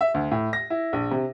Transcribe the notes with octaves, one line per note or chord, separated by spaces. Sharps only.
E5
D2
A2
A#6
E4
A#1
C3